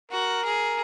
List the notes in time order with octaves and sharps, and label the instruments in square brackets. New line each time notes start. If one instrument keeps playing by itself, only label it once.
[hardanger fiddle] F#4 [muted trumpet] A#4
[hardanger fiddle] G#4